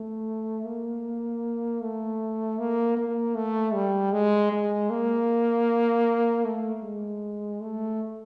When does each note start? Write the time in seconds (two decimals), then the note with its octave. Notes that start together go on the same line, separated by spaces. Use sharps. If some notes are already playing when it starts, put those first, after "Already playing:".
Already playing: A3
0.65 A#3
1.81 A3
2.59 A#3
2.97 A#3
3.35 A3
3.74 G3
4.12 G#3
4.52 G#3
4.90 A#3
6.45 A3
6.83 G#3
7.61 A3